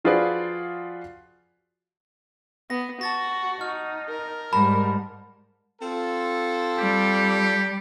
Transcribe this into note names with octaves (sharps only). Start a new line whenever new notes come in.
F3 F4 F#4 G#4 B4 D5
B3 A#6
F#4 A5 A6 A#6
D#4 F6
A#4
G#2 G3 A5 B5
C4 F4 A4
G3 G4